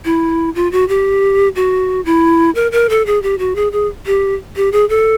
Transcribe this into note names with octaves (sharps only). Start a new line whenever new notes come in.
E4
F4
F#4
G4
F#4
E4
A#4
A#4
A4
G#4
G4
F#4
G#4
G#4
G4
G4
G#4
A4